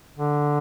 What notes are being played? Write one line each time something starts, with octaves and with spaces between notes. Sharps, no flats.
D3